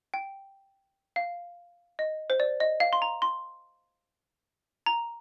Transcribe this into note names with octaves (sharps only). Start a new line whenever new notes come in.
G5
F5
D#5
C5
D5
D#5
F5
C6
A#5
C6
A#5